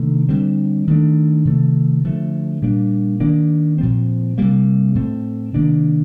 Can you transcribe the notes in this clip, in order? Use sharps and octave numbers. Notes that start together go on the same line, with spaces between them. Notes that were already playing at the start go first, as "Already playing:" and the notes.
Already playing: C3 D#3 A3 D4
D3 G3 C4
D#3 A3 D4
C3 D#3 A3
D3 F3 A3
A#2 G3 A#3 D4
D#3 A#3 D4
A#2 F3 C4
C3 G3 A#3
A2 A3 C4
C3 D#3 A#3 D4